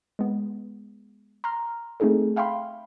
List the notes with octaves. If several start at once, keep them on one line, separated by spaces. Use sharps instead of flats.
G#3 B3
A#5 C6 F6
A3 C4 D#4 G#4 A4
E5 F5 G5 B5 C6